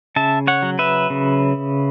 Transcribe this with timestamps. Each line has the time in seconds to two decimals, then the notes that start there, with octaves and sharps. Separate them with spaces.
0.16 C#3 E5 A5
0.47 C#5 F#5
0.63 F#3
0.79 B4 E5
1.10 C#3